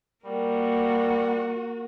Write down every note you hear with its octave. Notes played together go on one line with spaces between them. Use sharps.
G3 A#3 F#4 A#4